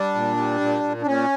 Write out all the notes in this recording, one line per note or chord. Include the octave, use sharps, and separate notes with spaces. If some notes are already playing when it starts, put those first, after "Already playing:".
Already playing: G3 D4
A#2
G3
A#2
A#2
D4
A#2 C#4